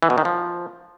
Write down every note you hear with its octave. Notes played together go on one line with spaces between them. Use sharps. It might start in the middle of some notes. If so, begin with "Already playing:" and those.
E3
B2
D#3
F3